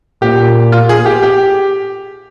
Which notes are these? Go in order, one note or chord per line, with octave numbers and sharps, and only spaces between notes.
A#2 G4
F4
G#4
G4
G4